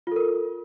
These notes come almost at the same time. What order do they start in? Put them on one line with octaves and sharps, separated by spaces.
F4 A4 A#4